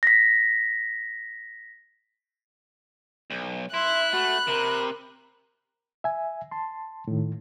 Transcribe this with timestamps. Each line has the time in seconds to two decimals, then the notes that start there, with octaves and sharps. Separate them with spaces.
0.03 A#6 B6
3.30 B1
3.74 E4 E5 C6 F#6
4.13 A3 F#4 B5
4.48 C3 A#4
6.04 E5 G#5
6.51 A5 C6
7.08 A2 D#3